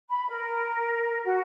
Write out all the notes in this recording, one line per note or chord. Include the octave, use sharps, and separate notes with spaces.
B5
A#4
F#4